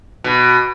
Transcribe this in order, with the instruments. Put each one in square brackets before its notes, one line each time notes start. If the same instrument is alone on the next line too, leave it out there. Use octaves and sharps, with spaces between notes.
[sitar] B2